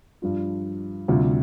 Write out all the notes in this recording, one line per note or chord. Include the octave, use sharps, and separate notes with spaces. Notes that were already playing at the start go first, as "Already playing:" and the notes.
G2 F3 D4 F4
D2 C3 G3 C4 F4